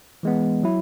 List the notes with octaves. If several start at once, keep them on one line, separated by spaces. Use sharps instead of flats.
E3 G#3 B3
F#3 E4